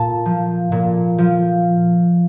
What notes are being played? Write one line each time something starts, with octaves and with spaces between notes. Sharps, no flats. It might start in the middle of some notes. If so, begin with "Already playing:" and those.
Already playing: A#2 A5
F3
A#2
F3